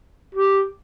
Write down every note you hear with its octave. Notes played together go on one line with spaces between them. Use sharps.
G4